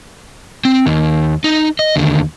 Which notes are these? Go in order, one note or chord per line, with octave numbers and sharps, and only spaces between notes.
C4
D#2
D#4
D#5
D#2 D3